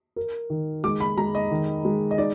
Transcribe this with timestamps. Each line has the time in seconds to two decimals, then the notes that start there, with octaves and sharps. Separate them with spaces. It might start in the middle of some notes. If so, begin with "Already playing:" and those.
0.16 A#4
0.50 D#3
0.84 G#3 D6
1.00 B5
1.17 G#3 A#5
1.35 D#5
1.51 D#3
1.85 G#3
2.11 D#5
2.18 D#4 D5